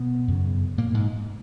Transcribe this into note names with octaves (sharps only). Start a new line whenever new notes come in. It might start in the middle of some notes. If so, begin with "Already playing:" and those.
Already playing: B2 B3
F#2 C#3
A#2 A#3
G#2 G#3